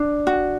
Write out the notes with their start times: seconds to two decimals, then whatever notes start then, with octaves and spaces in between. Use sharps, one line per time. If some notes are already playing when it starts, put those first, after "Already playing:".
Already playing: D4
0.27 F#4